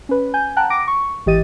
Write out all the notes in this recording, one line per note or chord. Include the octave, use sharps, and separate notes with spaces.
C#4 B4
G#5 G6
F#5 G5 A5 A#5 F#6
D6 A#6 D7
C#6
G#1 E3 G4 D#5 A6 D#7